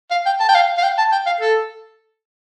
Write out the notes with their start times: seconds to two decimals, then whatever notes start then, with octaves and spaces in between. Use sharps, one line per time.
0.11 F5
0.26 G5
0.40 A5
0.48 G5
0.55 F5
0.78 F5
0.83 G5
0.98 A5
1.12 G5
1.26 F5
1.41 A4